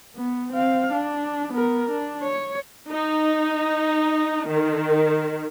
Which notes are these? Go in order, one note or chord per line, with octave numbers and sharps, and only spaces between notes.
B3
C4 F5
D4
B3 A#4
D4
C#5
D#4
D#3